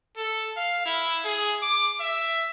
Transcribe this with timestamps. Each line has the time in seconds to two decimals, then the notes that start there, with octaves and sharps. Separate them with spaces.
0.17 A4
0.57 F5
0.86 E4
1.25 G#4
1.62 D6
2.00 E5